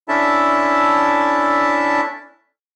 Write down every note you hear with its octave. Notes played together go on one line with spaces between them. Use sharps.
C#4 D4 E4 A4 E5 A5